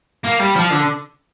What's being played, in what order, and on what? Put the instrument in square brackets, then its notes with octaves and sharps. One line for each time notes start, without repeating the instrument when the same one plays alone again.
[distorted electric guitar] A#3
G3
F3
D3